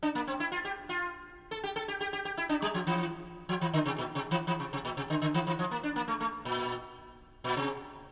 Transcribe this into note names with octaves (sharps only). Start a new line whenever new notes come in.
D4
A#3
C4
E4
F4
G4
F4
A4
G4
A4
G4
G4
G4
G4
E4
D4
G3
F3
E3
F3
E3
D3
C3
A#2
C3
E3
E3
C3
C3
A#2
C3
D3
D3
E3
E3
F3
A#3
D4
A#3
A3
A3
A#2
A#2
C3